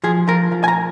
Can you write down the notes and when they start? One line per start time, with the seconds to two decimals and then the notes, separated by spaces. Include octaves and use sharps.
0.04 F3 G#4
0.28 F3 A#4
0.52 F3
0.64 G#5
0.68 A#5